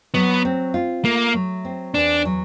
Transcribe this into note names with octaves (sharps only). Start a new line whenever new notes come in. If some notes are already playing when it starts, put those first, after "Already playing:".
F#3 B3
C4
F4
A3 A#3
F#3
C4
E2 D4
F#3